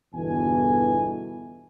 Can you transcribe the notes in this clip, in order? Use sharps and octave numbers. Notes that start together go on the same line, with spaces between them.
G1 E2 B2 E3 A4 G#5